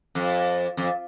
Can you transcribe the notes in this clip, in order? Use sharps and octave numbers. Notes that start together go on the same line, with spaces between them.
F2
F2